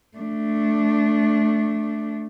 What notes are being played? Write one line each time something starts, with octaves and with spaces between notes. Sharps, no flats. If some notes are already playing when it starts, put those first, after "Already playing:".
A3 D4